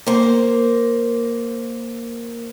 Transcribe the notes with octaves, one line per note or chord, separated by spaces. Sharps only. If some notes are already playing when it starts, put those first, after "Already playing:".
A#3 C5